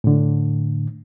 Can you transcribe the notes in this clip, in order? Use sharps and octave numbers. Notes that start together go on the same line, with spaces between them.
A2 D3